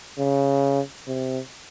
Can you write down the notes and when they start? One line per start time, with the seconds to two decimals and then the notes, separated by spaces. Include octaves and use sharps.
0.18 C#3
1.07 C3